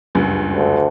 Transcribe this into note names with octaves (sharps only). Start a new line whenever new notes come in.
F#1 C#2 G2
D2